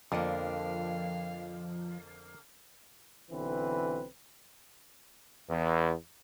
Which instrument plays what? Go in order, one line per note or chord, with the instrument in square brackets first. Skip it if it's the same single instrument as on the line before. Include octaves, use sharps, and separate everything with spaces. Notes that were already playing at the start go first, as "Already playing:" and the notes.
[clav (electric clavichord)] F2 [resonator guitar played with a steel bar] D3 A#3 [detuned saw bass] F3 [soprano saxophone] F5
[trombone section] B1 D3 E3 C4 B4
E2